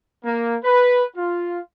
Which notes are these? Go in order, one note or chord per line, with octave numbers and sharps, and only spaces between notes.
A#3
B4
F4